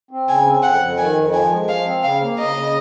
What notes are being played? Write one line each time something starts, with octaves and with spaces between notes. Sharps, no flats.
C4
C#3 G#5
C4
F2 F#5
F2
D#3 G#5
F2
F3 G#5
G#3
F3 F5
C4
C#3 F5
A#3
C#3 D#5
C#3